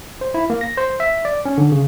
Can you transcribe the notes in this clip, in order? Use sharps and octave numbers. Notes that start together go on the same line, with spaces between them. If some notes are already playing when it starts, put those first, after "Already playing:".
C5
E4
A#3
A#6
C5
E5
D5
C#4
D3
C#3